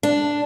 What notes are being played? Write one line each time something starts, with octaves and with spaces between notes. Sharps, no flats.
D4